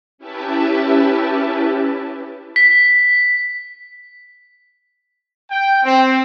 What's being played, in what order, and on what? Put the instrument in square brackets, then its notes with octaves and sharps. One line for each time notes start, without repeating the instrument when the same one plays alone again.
[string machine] C#4 E4 G4 B4 E5 A5
[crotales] B6
[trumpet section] G5
C4